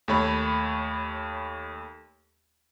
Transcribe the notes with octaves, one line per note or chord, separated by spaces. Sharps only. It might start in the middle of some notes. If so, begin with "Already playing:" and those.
D#2 A3 C#5 B5